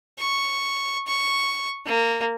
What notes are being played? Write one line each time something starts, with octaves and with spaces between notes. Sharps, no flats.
C#6
C#6
A#3